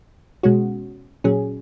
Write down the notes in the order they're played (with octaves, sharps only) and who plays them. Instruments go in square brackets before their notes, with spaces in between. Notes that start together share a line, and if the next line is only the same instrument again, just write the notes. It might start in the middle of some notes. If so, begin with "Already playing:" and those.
[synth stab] B2 G#3 C#4 F#4
A#2 F#3 C#4 G#4